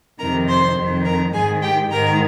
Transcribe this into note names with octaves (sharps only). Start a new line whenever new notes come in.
F2 C3 D#3 A#4 A#5
C5 C6
F2 D#3
A#4 A#5
G#2 D#3 G#4 G#5
G4 G5
G#2 D#3 A#4 A#5